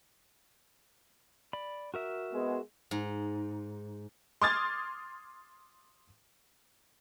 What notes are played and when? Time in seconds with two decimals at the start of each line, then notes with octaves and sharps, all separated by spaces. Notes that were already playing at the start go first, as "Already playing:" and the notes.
1.53 D5 B5
1.94 F#4 A#4 E5
2.32 G#3 B3
2.91 G#2
4.42 C6 D6 D#6 F6 G#6 A6